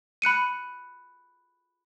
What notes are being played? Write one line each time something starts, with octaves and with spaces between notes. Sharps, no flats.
B5 F#6 C#7 D#7